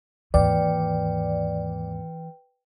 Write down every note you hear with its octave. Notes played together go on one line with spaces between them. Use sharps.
D#2 G#2 E3 B4 D5 G5